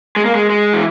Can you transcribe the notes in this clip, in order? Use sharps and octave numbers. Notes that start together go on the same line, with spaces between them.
G#3
A#3
G#3
G#3
E3